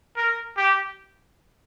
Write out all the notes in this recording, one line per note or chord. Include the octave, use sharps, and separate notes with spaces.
A#4
G4